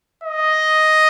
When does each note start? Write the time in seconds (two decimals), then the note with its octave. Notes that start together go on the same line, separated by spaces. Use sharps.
0.24 D#5